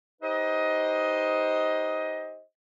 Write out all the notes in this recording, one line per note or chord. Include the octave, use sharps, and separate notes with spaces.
D#4 G4 B4 C5 D#5